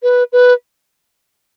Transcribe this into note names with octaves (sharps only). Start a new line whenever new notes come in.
B4
B4